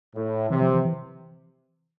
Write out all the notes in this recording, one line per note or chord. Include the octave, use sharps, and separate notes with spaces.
A2
C3 E3
F3
E3
E3